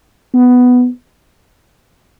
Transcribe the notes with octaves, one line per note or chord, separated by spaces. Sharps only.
B3